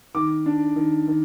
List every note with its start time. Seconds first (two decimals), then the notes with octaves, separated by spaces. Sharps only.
0.14 D#3 D6
0.46 D4
0.76 D#3
1.08 D#3